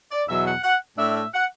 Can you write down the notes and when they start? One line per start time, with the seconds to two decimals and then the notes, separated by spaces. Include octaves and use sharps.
0.12 D5
0.28 E2 B2 F#3 E5
0.46 F#5
0.63 F#5
0.98 A2 A3 D4 E5
1.15 E5
1.33 F#5